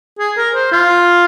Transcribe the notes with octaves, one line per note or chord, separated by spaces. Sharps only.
G#4
A#4
C5
F4